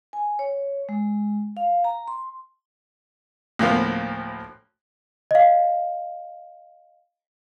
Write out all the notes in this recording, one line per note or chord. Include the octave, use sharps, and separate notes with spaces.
G#5
C#5
G#3
F5
A#5
C6
D2 A2 F3 A#3 B3
D#5 F5